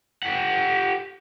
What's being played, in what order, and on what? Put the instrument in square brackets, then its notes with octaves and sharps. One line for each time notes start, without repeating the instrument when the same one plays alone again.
[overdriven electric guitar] G4 F#5